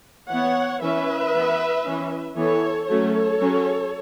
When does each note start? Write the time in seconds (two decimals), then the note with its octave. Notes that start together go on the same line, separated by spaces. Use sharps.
0.30 E3 B3 C#5 F#5
0.82 E3 C#4 B4 E5
1.33 E3 B3
1.85 E3 C#4
2.36 E3 B3 A4 C#5
2.88 F#3 A3 C#4 A4 C#5
3.40 F#3 C#4